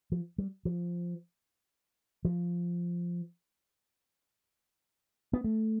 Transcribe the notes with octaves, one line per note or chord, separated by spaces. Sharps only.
F3
G3
F3
F3
B3
A3